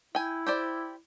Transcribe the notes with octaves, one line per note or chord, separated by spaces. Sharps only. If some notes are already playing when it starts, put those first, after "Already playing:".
E4 G5 G#5
G4 C5 D5